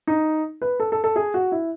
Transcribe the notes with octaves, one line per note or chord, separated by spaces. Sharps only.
D#4
B4
A4
A4
A4
G#4
F#4
E4